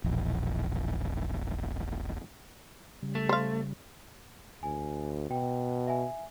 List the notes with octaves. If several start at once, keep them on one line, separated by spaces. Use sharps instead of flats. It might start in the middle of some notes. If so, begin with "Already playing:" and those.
E1 A#1
C#3 G3
A3
C5 F5
D2 G#5
B2 F#4 G5
E5 G#5